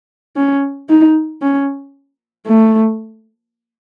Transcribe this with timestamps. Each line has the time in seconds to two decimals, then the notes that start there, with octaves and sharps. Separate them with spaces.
0.36 C#4
0.89 D#4
1.42 C#4
2.47 A3